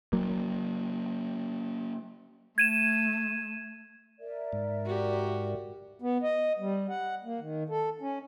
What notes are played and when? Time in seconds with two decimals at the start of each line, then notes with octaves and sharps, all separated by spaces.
0.13 F#3 A#3
2.58 A3 G#6 D#7 E7
4.20 A#4 D5 E5
4.53 G#2
4.85 F#4 G4
6.02 B3
6.23 D#5
6.59 G3
6.89 F#5
7.24 A#3
7.40 D#3
7.70 A4
8.01 C#4